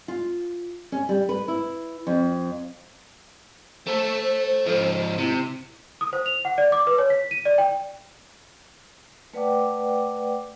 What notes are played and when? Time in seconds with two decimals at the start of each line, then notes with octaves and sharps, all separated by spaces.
0.08 F4
0.92 C#4
1.09 G3
1.29 B4
1.48 E4
2.07 F2
3.87 A3 A4 C5
4.67 G#2 F3
5.18 C3 E4
6.01 D#6
6.13 C5
6.26 F7
6.45 F#5
6.58 D5
6.72 D6
6.87 B4
6.98 C#5
7.10 B6
7.31 D#7
7.45 D5
7.58 G5
9.33 A3 B4 D5 F#5 G5 D6